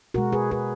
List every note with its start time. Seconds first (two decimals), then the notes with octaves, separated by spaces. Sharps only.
0.14 B2 G#3 F#4 A#4
0.32 G#4 B4
0.51 G#4 B4